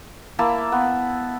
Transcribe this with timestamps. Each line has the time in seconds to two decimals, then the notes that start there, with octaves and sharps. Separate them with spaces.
0.39 A#3 E4 E5 A5
0.72 B3